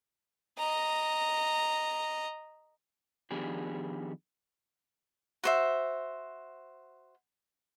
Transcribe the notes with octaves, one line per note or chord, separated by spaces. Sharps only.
D#5 A#5
D#3 F3 B3 D4 G4 G#4
F#4 C5 E5